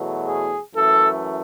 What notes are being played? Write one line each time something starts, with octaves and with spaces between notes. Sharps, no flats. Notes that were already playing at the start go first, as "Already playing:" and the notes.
Already playing: E2 B2 F#3 A3
G#4
F#2 E3 A3 A4